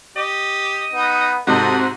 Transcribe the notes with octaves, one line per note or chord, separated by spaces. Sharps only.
G4 D#5
B3 D#4
G#2 C3 F#4 A4 D#5 G6